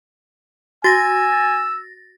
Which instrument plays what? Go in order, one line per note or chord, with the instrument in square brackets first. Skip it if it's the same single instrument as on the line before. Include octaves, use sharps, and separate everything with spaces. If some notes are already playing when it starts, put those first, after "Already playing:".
[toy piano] F#4 [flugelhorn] G#5 [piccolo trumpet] E6 [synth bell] A6 A#6